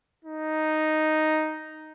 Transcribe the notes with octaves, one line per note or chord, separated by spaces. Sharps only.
D#4